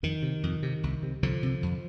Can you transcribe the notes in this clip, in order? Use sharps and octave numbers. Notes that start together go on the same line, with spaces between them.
F2 D#3
C3
F2
C3
C2
C3
C2 D3 F3
C3
F2